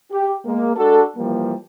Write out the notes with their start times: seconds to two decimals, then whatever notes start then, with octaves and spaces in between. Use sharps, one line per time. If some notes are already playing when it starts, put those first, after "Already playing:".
0.11 G4
0.46 G#3 A#3
0.76 G#3 D4 F#4 A4
1.17 E3 F3 G3 A#3